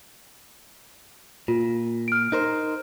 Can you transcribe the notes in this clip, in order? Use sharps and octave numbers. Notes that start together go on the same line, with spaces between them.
A#2 F4
F6 D7
D#4 A#4 C5